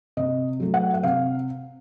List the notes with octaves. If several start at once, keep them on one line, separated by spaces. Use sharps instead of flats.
C3 D#5
F#3 A3
F#5
F#5
C3 F5